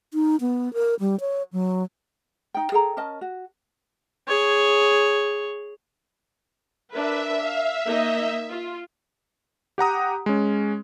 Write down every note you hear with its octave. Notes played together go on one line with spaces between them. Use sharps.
D#4
B3
A#4
G3
C#5
F#3
D#4 G5
G#4 A4 G5 A#5
C#4 A#4 D#5 A5
F#4
G#4 C#5
D4 A#4 B4 E5
F5
A#3 D#4 D#5
F4
G4 F#5 A#5 D#6
G#3 C#4